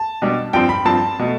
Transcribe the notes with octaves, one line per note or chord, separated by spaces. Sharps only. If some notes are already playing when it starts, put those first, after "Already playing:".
Already playing: A5
B2 G3 D4
G2 F3 C4 G5
B5
G2 F3 C4 A5
B2 A3